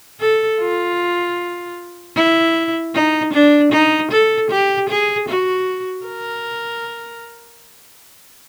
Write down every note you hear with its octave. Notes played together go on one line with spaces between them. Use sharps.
A4
F4
E4
D#4
D4
D#4
A4
G4
G#4
F#4
A#4